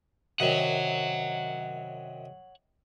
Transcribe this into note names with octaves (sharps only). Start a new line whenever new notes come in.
F#2 C3 D#3 C#5 F#5